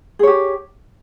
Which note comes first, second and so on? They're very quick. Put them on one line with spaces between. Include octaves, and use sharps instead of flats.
G#4 C#5 G4